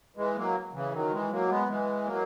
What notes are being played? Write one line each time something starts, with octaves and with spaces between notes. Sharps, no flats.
E3 G#3
F#3 A#3
C#3 E3
D#3 F#3
E3 G#3
F#3 A#3
G#3 B3
E3 G#3
F#3 A#3